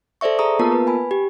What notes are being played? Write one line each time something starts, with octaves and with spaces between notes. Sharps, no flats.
A4 C5 D5 E5 C#6
G#4 A#5 C#6 D#6
A#3 B3 F4 A#4 A5
B4
G#5 B5
G4